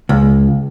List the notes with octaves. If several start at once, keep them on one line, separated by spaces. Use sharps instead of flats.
C#2